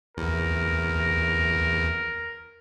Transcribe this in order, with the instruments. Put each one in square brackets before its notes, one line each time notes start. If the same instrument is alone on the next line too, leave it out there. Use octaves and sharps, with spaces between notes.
[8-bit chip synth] E2 [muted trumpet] A#4